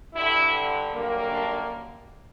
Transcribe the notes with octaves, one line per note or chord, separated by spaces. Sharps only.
G2 D3 G3 E4
F#2 D3 G3 A#3
D4